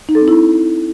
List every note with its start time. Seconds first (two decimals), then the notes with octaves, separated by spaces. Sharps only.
0.09 D#4
0.15 A4
0.21 C4
0.28 E4